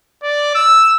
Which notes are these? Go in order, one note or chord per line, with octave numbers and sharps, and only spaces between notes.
D5
E6